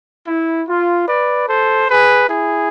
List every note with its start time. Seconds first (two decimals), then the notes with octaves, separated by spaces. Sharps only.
0.27 E4
0.67 F4
1.07 B4 D5
1.48 A4 C5
1.89 G#4 B4
2.29 E4 G#4